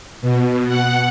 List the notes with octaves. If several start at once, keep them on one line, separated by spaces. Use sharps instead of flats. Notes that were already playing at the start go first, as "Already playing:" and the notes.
B2
F#5